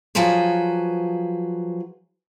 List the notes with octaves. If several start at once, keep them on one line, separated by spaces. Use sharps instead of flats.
F3 F#3 G#4 B4 C5